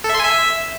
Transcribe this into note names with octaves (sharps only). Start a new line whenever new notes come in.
A4
E5
C6
G#5
E5